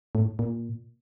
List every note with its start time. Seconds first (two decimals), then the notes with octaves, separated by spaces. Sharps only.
0.15 A2
0.39 A#2